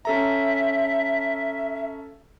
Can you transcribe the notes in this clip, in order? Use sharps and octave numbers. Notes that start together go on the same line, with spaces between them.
C#4 A4 E5 A#5